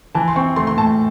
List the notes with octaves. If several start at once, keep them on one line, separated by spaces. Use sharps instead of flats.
E3 A5
C6
C4 C#6
A3 C6
C6
A2 A5